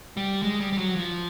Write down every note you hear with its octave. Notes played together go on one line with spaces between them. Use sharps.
G3
G#3
G3
G3
F#3
F3